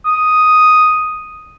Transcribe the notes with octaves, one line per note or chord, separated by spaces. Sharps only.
D#6